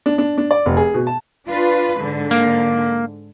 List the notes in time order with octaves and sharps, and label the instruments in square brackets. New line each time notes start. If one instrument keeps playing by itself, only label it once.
[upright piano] D4
D4
D4
D5
F1
G#4
B2
A5
[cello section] D4 F4 B4
G#2 D3
[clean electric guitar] A#3